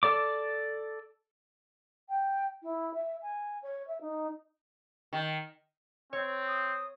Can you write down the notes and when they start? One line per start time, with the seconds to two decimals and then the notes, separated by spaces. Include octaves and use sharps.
0.03 A4 D5 D6
2.09 G5
2.63 E4
2.94 E5
3.22 G#5
3.63 C#5
3.87 E5
4.01 D#4
5.13 D#3
6.13 C4 C#5
6.47 D#6